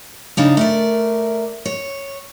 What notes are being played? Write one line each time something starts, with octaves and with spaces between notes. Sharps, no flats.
C#3 D4 D#4
A3 A#4 D5
C#5